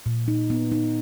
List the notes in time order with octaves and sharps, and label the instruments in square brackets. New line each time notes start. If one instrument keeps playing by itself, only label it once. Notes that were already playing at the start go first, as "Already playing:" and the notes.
[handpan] A#2
D#4
B3
D#4